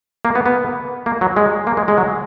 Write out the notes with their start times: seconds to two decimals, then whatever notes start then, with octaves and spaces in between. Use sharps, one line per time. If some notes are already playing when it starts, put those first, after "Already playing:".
0.25 A#3
0.35 B3
0.46 B3
1.06 A#3
1.21 F#3
1.36 G#3
1.67 A#3
1.77 G#3
1.88 G#3
1.98 F#3